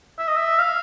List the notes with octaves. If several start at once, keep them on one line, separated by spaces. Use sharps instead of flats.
E5
D#5
E5
F5